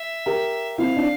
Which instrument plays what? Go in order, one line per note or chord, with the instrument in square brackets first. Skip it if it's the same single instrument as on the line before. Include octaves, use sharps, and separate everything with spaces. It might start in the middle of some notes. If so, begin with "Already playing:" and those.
Already playing: [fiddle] E5
[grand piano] G4 A#4
[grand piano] C4 E4 [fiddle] F5
[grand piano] D4